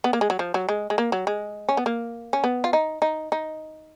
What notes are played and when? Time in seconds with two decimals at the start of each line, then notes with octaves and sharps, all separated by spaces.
0.04 B3
0.13 A#3
0.21 G#3
0.30 F#3
0.39 F3
0.54 F#3
0.69 G#3
0.90 G#3
0.98 A#3
1.12 F#3
1.27 G#3
1.69 C#4
1.77 B3
1.86 A#3
2.33 C#4
2.44 B3
2.64 F4
2.73 D#4
3.02 D#4
3.32 D#4